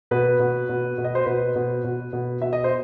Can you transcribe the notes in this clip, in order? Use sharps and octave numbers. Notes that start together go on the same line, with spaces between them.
B2 B4
B2
B2
B2
D#5
C5
B2 B4
B2
B2
B2
B2 E5
D#5
C5